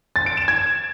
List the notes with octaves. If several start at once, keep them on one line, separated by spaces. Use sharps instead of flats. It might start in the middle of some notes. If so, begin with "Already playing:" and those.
A6
D7
E7
G#6